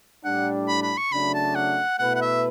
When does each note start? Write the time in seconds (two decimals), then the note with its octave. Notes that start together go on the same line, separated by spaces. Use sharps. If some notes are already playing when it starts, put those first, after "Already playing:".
0.25 A2 G3 D4 F#5
0.68 B5
0.83 B5
0.97 C#6
1.12 C#3 F#3 A3 D4 B5
1.34 A5
1.55 F#5
1.99 B2 A3 E4 B4 F#5
2.15 F#5
2.21 E5